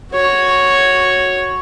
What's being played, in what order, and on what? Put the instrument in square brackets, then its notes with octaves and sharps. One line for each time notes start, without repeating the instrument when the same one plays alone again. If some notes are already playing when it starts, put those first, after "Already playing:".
[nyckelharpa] F#4 C#5